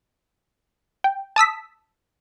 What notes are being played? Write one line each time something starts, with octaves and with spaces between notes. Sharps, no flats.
G5
A5 D#6 E6 B6